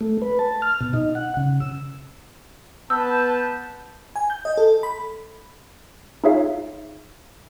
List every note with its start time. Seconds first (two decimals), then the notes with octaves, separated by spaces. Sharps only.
0.01 A3
0.22 B4
0.39 A5
0.62 F6
0.81 B2
0.94 D#4
1.15 F#5
1.37 C#3
1.60 E6
2.90 B3 B4 A5 E6 G6
4.16 G#5
4.30 G6
4.45 D#5
4.57 A4
4.83 B5
6.24 D#4 F4 G#4 C#5 E5 F5